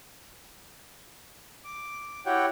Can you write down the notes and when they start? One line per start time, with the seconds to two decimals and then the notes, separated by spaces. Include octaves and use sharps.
1.65 D6
2.26 E4 F#4 G4 C#5 F#5 G5